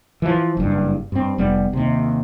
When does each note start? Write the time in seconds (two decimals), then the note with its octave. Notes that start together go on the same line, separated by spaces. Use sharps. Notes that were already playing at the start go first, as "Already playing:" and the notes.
0.22 E3 F3
0.57 F#1 G2
1.12 G2 C4
1.38 F1 G3 B3
1.73 D#2 C3